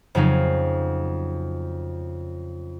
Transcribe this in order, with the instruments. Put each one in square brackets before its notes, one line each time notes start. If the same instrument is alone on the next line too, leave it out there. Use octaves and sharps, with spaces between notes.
[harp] F2 C#3 F#3 D#4 F5